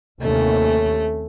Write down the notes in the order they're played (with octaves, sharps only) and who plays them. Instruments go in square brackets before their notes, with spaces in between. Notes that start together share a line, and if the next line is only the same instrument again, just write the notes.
[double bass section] D#2 C3 C#4 [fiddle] A3